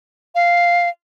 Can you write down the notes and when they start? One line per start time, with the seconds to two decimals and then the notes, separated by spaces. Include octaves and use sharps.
0.35 F5